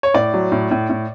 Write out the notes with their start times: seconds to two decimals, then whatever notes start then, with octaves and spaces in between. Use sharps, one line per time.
0.03 C#5
0.14 A2 D5
0.34 F#3
0.52 A2
0.71 A2
0.89 A2